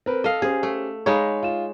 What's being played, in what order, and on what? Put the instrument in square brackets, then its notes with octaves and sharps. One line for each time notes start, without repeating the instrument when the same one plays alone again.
[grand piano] C4 A#4 B4
[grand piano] A4 [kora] D#5 F5
[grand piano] C#4 G4 C5 [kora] G#4
[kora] A3
[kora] G#3 D#4 C#5 [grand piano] F5 B5
[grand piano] F4 E7